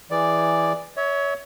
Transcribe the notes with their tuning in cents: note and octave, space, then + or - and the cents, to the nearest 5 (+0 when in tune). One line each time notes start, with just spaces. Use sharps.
E3 +0 G#4 -10 D5 +0
C#5 +20 E5 -30